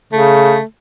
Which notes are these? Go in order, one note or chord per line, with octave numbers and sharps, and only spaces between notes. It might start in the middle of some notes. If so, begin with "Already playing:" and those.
C#3 A3